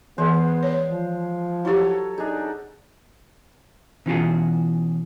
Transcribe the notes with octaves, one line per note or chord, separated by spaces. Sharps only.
E3 G#3 B3 G#4 C5
C#5 D5
F3
F#3 E4 G4 A4 C#5
D4 D#4 G#4
B2 E3 C#4 F4 F#4 G#4